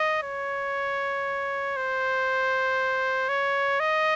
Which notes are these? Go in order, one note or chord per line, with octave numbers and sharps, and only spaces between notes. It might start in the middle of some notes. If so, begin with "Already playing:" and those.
Already playing: D#5
C#5
C5
C#5
D#5